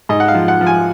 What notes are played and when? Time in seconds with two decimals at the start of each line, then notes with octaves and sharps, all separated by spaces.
0.09 G#2 D#5
0.20 F#5
0.28 F5
0.35 F3
0.48 F#5
0.61 F3
0.66 G#5